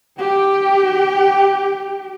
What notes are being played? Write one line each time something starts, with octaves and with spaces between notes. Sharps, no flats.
G4 G5